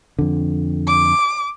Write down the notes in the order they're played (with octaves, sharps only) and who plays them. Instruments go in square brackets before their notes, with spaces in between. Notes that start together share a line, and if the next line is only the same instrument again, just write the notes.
[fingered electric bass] F2 D3
[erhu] D6